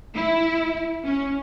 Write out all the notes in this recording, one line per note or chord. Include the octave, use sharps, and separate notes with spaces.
E4
C#4